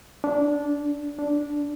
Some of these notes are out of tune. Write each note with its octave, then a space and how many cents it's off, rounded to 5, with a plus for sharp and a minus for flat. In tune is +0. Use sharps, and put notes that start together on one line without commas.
D4 -15
D4 -10